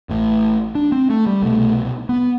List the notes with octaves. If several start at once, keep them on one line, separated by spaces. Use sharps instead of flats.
A1 A2
D4
C4
A3
G3
C2 B2 A3
B3